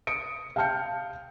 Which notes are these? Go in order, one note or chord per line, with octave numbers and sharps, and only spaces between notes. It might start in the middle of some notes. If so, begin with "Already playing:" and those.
D#6 C#7 D7
F5 G5 A5 F6 G6 C#7